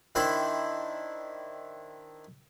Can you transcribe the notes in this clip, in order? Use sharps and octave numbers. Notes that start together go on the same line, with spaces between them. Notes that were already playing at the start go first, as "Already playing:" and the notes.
D#3 D4 E4 C5 G5 B5